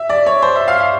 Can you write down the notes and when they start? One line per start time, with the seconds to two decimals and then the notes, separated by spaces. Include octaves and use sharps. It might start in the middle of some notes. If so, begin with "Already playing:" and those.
Already playing: E5
0.09 D5
0.26 C#5
0.42 C5
0.56 E5
0.68 F5
0.80 F5